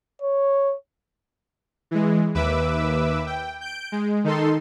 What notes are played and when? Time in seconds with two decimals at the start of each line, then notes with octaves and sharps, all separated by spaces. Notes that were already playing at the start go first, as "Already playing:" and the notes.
0.22 C#5
1.91 E3 G#3
2.35 D#2 B4 E5 D6 E6
3.27 G5
3.61 G6 D7
3.92 G#3
4.24 D#3 D#4 A4 C6